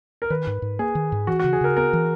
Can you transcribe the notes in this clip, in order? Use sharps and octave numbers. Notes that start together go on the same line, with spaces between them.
A#4
D#3 B4
G#2
G#2
A#3 G#4
D#3
G#2
E3 F#4
C#3 F#4
G#4
C#3 A#4
B3 A#4
E3